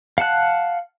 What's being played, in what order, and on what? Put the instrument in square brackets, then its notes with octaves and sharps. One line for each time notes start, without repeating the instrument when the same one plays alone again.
[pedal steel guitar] F5 F#5 A5 F#6